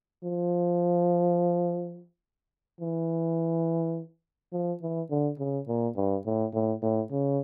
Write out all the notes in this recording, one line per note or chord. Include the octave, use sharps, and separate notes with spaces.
F3
E3
F3
E3
D3
C#3
A#2
G2
A2
A2
A2
C#3